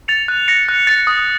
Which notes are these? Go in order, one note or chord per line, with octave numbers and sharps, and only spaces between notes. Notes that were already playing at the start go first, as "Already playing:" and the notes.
A6 C#7 F7
F#6
A#6 C#7
F#6
A6 C#7
D#6